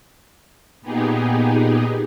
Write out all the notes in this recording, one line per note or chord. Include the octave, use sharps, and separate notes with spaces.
A#2 B3 D#4 G4 G#4